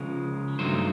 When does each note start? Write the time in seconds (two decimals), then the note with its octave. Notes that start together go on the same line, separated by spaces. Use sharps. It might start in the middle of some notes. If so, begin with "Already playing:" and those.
Already playing: C#2 C#3 F3 G#3 A#4
0.59 G2 D#3 F#3 A3 C5